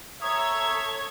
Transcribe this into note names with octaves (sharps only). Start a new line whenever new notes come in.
A4 C#5 E5 A#5 D#6 G#6